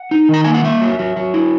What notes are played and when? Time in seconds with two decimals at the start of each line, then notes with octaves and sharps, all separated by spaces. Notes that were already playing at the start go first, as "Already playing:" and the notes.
Already playing: F#5
0.11 D#4
0.29 D#3 A#5
0.44 A#3 G#5
0.54 F#5
0.64 A#3 E5
0.81 F#3
0.99 F#3
1.16 F#3
1.34 E4